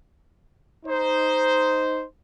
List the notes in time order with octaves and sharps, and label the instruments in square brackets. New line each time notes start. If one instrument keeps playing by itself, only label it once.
[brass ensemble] D#4 C5